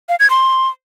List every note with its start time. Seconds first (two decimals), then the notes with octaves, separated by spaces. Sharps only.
0.09 F5
0.20 G#6
0.30 C6